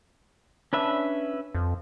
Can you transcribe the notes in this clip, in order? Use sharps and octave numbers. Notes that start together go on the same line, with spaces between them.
C#4 D4 B4 E5
F2